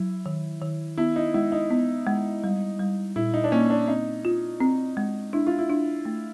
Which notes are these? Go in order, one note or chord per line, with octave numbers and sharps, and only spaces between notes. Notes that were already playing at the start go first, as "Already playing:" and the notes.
Already playing: F#3 E4
D#3
D#3
B3 E4
D#4
G#3 E4
D#4
B3
G#3
G3
G3
A#2 E4
D#4
D4
A#3 C#4
D4
C4 D#4
F4
C4
G#3
D4 E4
F4
E4
D4
A3